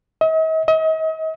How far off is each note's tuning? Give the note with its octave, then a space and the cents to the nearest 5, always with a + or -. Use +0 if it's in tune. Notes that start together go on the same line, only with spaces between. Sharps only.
D#5 +45
D#5 +40